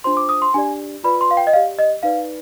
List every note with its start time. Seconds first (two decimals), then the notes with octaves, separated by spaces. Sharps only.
0.04 D4 F4 C5 C6
0.17 D6
0.29 D#6
0.42 C6
0.54 D4 G4 D5 G#5
1.04 F4 B4 D5 B5
1.21 C6
1.31 F5
1.37 G5
1.47 D#5
1.53 G4 D5 F5
1.79 D#5
2.03 D#4 B4 D5 F5